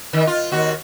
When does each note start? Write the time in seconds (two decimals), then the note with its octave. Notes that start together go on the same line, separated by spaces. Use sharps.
0.13 D#3
0.27 F4
0.52 D#2 F#4